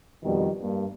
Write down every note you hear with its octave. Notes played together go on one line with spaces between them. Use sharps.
F2 B2 D#3 G3
G2 A#3